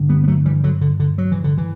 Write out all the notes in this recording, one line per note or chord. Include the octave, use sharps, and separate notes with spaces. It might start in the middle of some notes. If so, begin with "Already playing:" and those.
Already playing: G2 D3
G3 B3
B3
F#3 A3
E3 G3
D3 F#3
D3
D3
F#3
E3
D3
E3